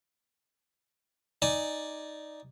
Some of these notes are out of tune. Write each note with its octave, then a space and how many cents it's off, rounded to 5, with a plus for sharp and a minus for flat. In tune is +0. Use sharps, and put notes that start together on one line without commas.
D#4 +0 D5 +0 G#5 +0